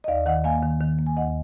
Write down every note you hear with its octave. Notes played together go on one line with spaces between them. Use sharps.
D#5
D#2 D5 F5
D#3 D#5 F#5
A#3 F5 G#5
D#3
D#3
A#3
G#5
D#2 D#5 F#5